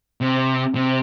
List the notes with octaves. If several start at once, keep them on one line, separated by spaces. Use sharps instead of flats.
C3
C3